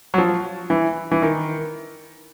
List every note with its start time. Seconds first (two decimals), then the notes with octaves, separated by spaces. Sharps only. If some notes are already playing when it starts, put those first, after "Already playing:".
0.14 F#3
0.18 F3
0.70 E3
1.12 E3
1.22 D#3